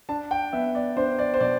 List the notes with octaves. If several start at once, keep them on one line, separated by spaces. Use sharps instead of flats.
D4 A5
G5
B3 E5
D5
D4 C5
D5
C5
B2 D5